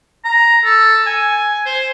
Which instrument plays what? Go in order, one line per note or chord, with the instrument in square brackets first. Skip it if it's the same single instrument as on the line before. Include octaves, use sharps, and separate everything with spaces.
[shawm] A#5
A4
G#5
C5